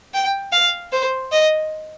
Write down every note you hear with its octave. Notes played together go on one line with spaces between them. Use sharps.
G5
F5
C5
D#5